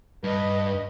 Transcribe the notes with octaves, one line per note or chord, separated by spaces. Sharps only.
G2 B4 D#5